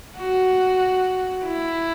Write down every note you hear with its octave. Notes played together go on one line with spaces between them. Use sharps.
F#4
E4